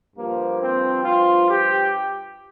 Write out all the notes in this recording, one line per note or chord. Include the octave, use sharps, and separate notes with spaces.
G2 F3 A#3
C4
F4
G4